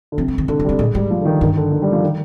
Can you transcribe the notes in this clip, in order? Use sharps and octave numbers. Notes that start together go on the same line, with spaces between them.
D3
C3 F3
G3
D#3
D3 D#3
D3
G3
C3
A#2 G#3
G#2 G3
F3
D3
D#3
G2 D#3
D3
D#3
G3
F3
D#3